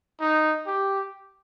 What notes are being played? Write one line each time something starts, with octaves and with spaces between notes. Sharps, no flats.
D#4
G4